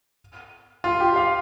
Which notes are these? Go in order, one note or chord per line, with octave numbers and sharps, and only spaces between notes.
F4
G4
F5